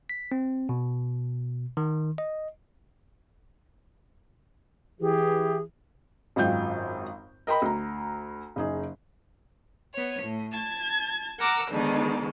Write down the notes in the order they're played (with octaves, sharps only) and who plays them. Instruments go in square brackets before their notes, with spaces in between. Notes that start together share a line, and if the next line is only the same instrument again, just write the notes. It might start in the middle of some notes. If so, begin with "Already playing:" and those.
[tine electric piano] B6
C4
B2
D#3
D#5
[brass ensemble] E3 [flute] G4 [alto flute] G#4
[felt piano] G#1 F#2 G#3 F4 G5 G6
A#4 D#5 G5 B5
D2 A#5
F#1 D#4 G#4
[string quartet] B3 C#5
A2
A5 G#6
A#4 F#5 A#5 D6 E6
G#2 B2 D3 D#3